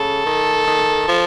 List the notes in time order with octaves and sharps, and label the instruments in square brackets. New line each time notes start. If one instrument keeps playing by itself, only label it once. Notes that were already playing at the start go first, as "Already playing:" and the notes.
Already playing: [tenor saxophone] C#3 [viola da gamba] A4
[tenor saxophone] D#3
D#3
F3